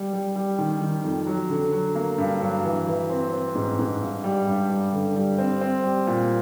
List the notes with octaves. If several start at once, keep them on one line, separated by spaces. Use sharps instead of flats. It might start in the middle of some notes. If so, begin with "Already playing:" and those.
Already playing: G3
G3
G3
D#3
D#3
F2
F#3
D3
F#3
A#3
G2
F#3
E3
E3
C4
C4
G#2
G#2
G2
G3
G2
G3
D3
G3
C4
C4
G3
A#2